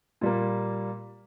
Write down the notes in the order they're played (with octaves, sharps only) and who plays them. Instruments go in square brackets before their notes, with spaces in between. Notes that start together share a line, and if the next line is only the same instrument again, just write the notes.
[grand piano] A#2 G3 A#3